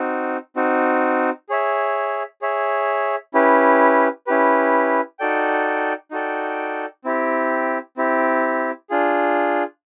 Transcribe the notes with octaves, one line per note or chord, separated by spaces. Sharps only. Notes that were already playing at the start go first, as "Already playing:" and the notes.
Already playing: C4 D#4 F#4
C4 D#4 F#4
G#4 C#5 E5
G#4 C#5 E5
C#4 E4 G4 B4
C#4 E4 G4 B4
D#4 F#4 A4 D5 G5
D#4 F#4 A4 D5 G5
C4 E4 G4
C4 E4 G4
D4 F4 G#4